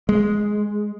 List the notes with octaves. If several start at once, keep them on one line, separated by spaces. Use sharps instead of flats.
G#3